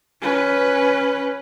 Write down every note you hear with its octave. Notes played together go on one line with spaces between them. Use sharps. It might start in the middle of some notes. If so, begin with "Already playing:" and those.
C#4 B4